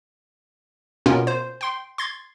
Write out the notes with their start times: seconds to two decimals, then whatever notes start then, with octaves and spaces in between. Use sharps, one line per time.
1.06 B2 A#3 B3 C#4 F4 A#4
1.27 C5
1.61 G5 C6
1.98 C6 G#6 A6